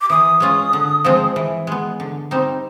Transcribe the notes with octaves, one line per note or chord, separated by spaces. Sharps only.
D6
E3 D#6
G#3 C#4 F4
D3
F3 G#3 C4
E3
G#3 B3
D3
G3 C4 D#4